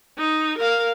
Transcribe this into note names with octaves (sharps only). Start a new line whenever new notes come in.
D#4
A#4 F5